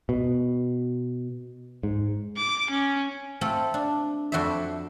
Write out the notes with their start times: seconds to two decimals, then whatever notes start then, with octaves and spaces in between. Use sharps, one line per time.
0.09 B2
1.83 G#2
2.37 D6
2.70 C#4
3.41 A3 C4 F4
3.74 D4
4.32 F2 F#4 C5 D5 E5